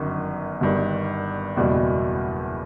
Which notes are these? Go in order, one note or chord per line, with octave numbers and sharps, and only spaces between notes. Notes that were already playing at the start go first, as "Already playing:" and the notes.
Already playing: G1 F#2 D#3
G1 G2 D#3
F#1 E2 B2 G3